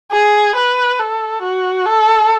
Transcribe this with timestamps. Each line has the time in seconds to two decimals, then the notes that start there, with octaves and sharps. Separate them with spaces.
0.12 G#4
0.56 B4
0.99 A4
1.42 F#4
1.86 A4